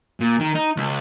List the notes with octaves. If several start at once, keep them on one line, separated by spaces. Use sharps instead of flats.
A#2
D#3
D#4
C#2